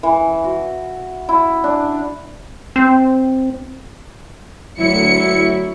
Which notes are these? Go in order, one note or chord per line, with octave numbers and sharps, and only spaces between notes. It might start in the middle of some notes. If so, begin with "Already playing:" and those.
E3
F#4
E4
D4
C4
D2 F#3 E4 C#7